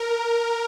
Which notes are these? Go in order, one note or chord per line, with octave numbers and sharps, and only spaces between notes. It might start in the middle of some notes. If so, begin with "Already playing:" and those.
Already playing: A#4